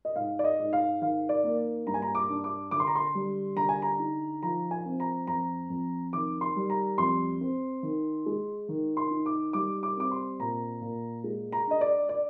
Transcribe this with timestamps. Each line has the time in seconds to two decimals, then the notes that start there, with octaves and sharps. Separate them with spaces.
0.05 D#5
0.15 G#2 F5
0.39 D5
0.44 D#5
0.59 G#2
0.73 F5
1.02 D#3 F5
1.29 D5
1.44 A#3
1.87 G2 A#5
1.94 G#5
2.02 A#5
2.15 D6
2.30 D4
2.44 D6
2.71 D3 D6
2.80 C6
2.87 A#5
2.95 C6
3.15 G3
3.57 D3 A#5
3.69 G#5
3.82 A#5
3.99 D#4
4.43 F3 A#5
4.71 G#5
4.86 C4
5.00 A#5
5.27 F2 A#5
5.70 F2
6.13 D#3 D6
6.41 C6
6.56 G3
6.70 A#5
6.98 F2 C6
7.41 C4
7.83 D#3
8.26 G#3
8.69 D#3
8.97 C6
9.11 D#4
9.26 D6
9.53 G3 D6
9.83 D6
9.97 C4 D6
10.11 C6
10.39 A#2 A#5
10.81 A#2
11.24 G#3
11.52 A#5
11.67 D4 D#5
11.81 D5
12.09 D5